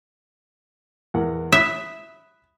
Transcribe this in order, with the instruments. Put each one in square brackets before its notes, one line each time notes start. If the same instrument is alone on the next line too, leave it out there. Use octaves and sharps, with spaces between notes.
[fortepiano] E2 A#4 F#5
[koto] E5 [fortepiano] B5 D#6 F#6